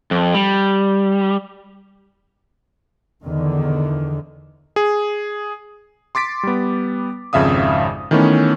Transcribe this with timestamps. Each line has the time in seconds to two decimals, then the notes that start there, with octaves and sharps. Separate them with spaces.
0.11 F2
0.34 G3
3.23 E2 D3 D#3
4.76 G#4
6.15 C6 D6 A6 B6 D7
6.43 G3 B3
7.33 G#1 F2 C#3 E5 F5 D#6
8.11 D#3 E3 A3 B3 C#4